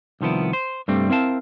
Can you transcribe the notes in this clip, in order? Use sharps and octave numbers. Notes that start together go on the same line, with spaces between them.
C2 D#3 F3 B3 E4
C5
G2 C3 G3 A3 C4
C4 E4 A#4 F5 A5